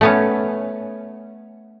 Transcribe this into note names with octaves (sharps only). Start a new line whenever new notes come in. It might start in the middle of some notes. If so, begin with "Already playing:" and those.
A3 B3 C#4